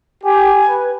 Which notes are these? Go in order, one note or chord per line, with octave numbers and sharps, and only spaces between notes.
G4 G#5
B4